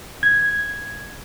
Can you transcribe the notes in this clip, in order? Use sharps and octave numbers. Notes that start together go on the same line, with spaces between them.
G#6